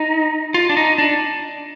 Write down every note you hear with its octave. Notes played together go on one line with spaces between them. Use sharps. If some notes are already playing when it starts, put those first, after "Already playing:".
Already playing: D#4
F4
D4
D#4
D4